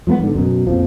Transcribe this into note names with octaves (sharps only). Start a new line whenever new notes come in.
F3 G#3 A3 B3
G#2 D3
F#2 B2
A#1 F2 F3